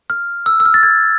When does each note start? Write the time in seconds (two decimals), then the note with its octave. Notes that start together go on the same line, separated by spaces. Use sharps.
0.10 F6
0.46 E6
0.60 E6
0.66 F6
0.74 A6
0.83 G#6